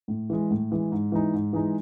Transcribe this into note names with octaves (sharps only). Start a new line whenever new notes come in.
A2
E3 G#3
A2
E3 G#3
G#2
E3 G#3 D#4
G#2
E3 G#3 D#4